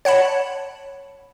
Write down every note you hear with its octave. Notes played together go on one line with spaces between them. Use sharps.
C#5 F#5 A5 B5